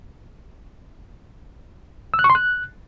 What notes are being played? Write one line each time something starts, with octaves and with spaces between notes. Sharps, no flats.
E6
F#6
C#6
C6
F#6